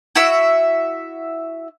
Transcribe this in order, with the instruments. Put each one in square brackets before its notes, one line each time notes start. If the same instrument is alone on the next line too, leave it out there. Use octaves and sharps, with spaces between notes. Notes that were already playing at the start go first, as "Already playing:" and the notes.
[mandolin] E4 F#4 E5 E6